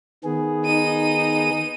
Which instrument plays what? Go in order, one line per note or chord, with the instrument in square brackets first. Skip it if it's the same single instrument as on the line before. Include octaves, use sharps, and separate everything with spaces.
[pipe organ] D#3 B3 G#4
[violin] D#4 D#7